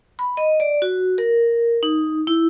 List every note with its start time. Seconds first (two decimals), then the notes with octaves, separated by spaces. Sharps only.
0.19 B5
0.37 D#5
0.60 D5
0.82 F#4
1.18 A#4
1.83 D#4
2.27 E4